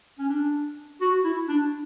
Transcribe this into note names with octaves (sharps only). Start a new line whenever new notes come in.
C#4
D4
F#4
E4
D4